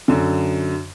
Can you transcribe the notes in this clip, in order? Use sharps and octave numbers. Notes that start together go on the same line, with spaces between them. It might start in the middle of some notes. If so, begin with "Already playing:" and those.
F#2 D3